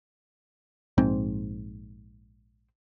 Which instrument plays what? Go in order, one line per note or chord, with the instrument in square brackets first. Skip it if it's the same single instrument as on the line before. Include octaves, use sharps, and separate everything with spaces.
[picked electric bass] A#1 G#2 C4